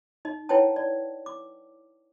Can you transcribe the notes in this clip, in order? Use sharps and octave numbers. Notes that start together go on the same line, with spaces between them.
D#4 D#5
E4 B4 C#5 F#5 G5 A5
D5
D6